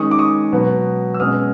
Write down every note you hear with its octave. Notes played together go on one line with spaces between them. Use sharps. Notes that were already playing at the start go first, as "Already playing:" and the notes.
Already playing: D#3 G#3 C#4 C#6 D#6
D6
C#6 D#6
B2 F#3 B3
E6
B2 G#3 C#4 D#6 F6